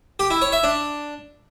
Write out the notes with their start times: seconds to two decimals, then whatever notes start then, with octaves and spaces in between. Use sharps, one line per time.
0.19 G4
0.30 E4
0.41 C#5
0.52 E5
0.63 D4